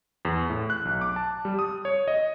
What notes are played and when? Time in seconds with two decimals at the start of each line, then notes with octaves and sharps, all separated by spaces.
0.25 E2
0.50 A2
0.70 F#6
0.85 B1
1.01 D6
1.16 A5
1.45 G3
1.59 D#6
1.85 C#5
2.08 D#5